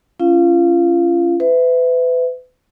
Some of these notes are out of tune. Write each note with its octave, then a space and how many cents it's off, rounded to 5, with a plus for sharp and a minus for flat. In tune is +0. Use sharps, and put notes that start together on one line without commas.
C#4 +0 F4 -35 F5 +0
B4 +35 E5 +0